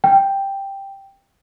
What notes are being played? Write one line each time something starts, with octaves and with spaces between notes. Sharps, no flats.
G5